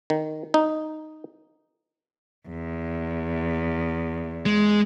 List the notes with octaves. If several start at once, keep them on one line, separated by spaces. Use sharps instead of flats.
D#3
D#4
E2
G#3